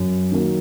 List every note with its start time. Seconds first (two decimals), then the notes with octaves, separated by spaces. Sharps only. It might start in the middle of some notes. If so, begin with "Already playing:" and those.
Already playing: F#2
0.32 D#3 F#3 A#3